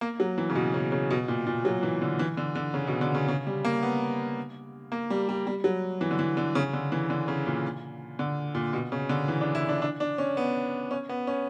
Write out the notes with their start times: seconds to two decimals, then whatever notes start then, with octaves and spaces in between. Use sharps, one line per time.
0.01 A#3
0.20 F#3
0.38 E3
0.49 C#3
0.55 B2
0.74 C#3
0.92 C#3
1.11 B2
1.28 A#2
1.46 A#2
1.65 F#3
1.83 E3
2.02 D3
2.19 E3
2.37 D3
2.55 D3
2.74 C#3
2.87 B2
3.01 D3
3.15 C#3
3.28 C#3
3.47 G3
3.65 A#3
3.82 B3
4.92 A#3
5.10 G3
5.29 G3
5.47 G3
5.64 F#3
6.01 E3
6.11 D3
6.19 E3
6.37 D3
6.55 C#3
6.73 D3
6.92 E3
7.10 D3
7.28 C#3
7.46 A#2
8.19 D3
8.55 A#2
8.73 B2
8.92 C#3
9.09 D3
9.28 E3
9.41 D4
9.55 E4
9.69 D4
9.82 D4
10.00 D4
10.18 C#4
10.37 B3
10.91 C#4
11.09 B3
11.27 C#4